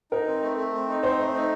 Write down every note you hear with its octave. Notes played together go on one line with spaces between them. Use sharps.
D#4 A#4
C4
A3
A3
C4
D#4
C4 C5
A3
D#4